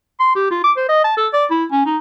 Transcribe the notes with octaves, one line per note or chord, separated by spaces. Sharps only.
C6
G4
F4
D6
C5
D#5
A5
A4
D5
E4
C#4
D#4